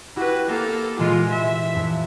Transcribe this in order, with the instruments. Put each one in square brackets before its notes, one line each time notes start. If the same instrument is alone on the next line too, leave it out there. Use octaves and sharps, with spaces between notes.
[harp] E4 G4 [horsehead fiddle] F#4 B4
[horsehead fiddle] A#3 A4
[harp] A#2 E3 C6 [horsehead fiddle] G#3 F4
[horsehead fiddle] E5
[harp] F2